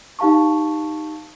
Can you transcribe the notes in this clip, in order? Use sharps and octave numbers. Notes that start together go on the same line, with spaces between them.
D#4 G4 F5 A5 C#6